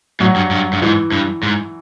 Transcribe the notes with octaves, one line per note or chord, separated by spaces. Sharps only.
A2 F#3
G2
G2
G2
G#2 E3
G2
G#2